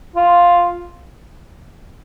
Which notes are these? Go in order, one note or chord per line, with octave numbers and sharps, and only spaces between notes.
F4